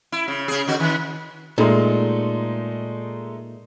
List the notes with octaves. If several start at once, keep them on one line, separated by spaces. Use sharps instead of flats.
E4
C#3
C#3 G#4
D3 F#4
D#3
A#2 G#3 A3 D#4